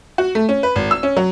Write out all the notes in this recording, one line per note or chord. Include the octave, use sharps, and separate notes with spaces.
F#4
A3
C#4
B4
G#1
E6
C#4
F#3